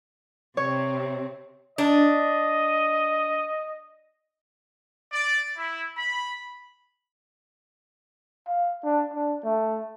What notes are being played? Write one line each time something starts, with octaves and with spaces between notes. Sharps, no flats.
C3 C4 C#5
D4 D#5
D5
E4
B5
F5
D4
D4
A3